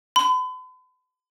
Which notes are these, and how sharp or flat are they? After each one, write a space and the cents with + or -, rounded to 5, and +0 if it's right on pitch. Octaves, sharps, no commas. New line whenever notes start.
B5 +45